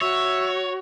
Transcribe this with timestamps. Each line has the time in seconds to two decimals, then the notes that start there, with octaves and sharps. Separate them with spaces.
0.01 F#4 C#5 E5